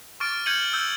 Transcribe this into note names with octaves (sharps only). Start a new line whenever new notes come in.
C#6 D6 F6 A6 D7
F6 G6 G#6 C#7 D#7 F#7
E6 G6